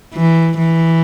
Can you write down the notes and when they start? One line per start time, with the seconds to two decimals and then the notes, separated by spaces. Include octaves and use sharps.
0.14 E3
0.58 E3